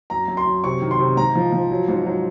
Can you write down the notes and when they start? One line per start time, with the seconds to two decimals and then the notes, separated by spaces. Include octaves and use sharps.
0.10 F#2 A#5
0.28 F#2
0.37 C6
0.46 F#2
0.64 C3 C#6
0.82 D#3
0.91 C6
0.99 C3
1.17 G#2 A#5
1.35 F3
1.52 F3
1.71 F#3
1.88 G#2
2.06 F#3